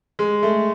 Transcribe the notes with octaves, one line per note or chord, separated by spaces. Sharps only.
G#3
A3